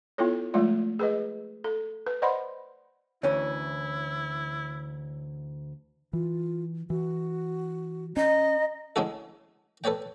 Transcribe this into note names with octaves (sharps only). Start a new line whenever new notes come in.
B3 E4 F4 A4 C#5
F3 G#3 A3 F4 D5
G#4 B4 D#5
A4
B4
C5 D5 D#5 F#5 B5 C6
D2 E3 C#4 E4 C#5
E3 F4
E3 F#4
C#4 D#5 A#5
D3 G#3 C#4 E4 F#4 A4
A4 B4 C#5 D5 G5